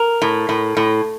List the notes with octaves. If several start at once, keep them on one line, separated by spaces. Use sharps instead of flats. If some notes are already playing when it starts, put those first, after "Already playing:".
Already playing: A#4
A2
A2
A2